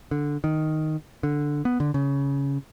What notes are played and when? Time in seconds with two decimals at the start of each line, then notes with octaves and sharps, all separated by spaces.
0.11 D3
0.44 D#3
1.23 D3
1.65 B3
1.80 D3
1.94 C#3